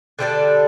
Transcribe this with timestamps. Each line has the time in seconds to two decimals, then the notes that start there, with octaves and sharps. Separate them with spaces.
0.19 D3 G3 D4 A4